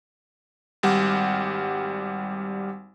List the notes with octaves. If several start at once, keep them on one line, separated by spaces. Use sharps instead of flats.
G#1 G3 F#5